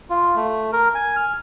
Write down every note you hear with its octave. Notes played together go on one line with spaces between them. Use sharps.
F4
A3
A#4
G#5
F6